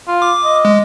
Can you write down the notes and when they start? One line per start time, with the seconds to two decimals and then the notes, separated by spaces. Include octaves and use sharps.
0.08 F4
0.22 D6
0.44 D#5
0.65 G#3